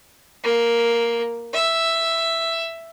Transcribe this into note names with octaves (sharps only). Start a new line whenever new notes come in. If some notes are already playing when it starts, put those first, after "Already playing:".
A#3
E5